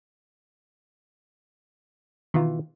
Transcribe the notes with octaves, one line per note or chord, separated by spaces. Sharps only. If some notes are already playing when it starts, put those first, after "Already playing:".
B2 D#3 E3 F4